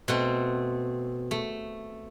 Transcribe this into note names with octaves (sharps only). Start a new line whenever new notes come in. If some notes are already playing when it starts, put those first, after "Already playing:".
B2 A3 C4
A3